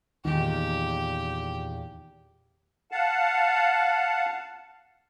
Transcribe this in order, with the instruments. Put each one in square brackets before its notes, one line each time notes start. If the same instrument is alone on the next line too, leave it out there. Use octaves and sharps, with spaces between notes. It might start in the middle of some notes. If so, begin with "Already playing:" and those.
[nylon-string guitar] E2 A#2 [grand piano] D#3 [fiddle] G4
[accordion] F5 F#5 A5